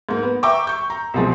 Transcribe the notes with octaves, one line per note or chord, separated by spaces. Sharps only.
G#2 A#3
B3
E5 G5 A#5 C#6 D6 E6
C#6 G6
A#5
C2 B2 F3 G#3